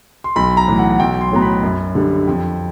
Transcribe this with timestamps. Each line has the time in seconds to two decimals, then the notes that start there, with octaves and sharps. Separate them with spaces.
0.24 C6
0.36 B1 B5
0.57 A#5
0.68 A2 E3
0.78 F#5
0.91 F#5
1.00 B1 G5
1.21 C6
1.31 A2 F#3 B3 A#5
1.42 B5
1.63 F#2
1.95 D3 G3
2.27 F2